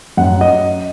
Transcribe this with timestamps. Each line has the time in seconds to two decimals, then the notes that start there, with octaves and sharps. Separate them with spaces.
0.17 F#2 F#5
0.41 D#5